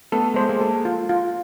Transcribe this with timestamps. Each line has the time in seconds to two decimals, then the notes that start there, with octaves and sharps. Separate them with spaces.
0.12 A3 B3 A4
0.34 G#3 C5
0.41 A3
0.49 G#3 A#3
0.61 A4
0.85 F4
1.09 F4